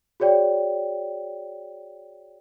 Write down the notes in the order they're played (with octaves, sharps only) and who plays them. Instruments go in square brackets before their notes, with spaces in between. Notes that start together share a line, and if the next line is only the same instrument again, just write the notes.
[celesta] F#4 G#4 C#5 D5 G5